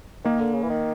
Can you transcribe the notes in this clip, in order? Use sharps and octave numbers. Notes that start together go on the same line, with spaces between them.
D#3 A#3
D3
C#3
E3
D#3